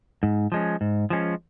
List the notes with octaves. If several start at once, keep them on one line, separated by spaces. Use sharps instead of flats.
G#2
F3 G#3 C#4
G#2
F3 G#3 C#4